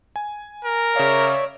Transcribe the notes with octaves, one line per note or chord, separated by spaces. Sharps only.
G#5
A#4
C#3 C#5 D5 E5 F5